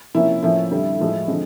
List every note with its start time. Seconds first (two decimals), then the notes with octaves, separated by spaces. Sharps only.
0.15 C3 F3 A#3 C#4 E4
0.43 A2 F3 A#3 C#4 E4
0.71 F2 D3 G3
1.00 A2 F3 G#3
1.28 D3 F3 G#3 C4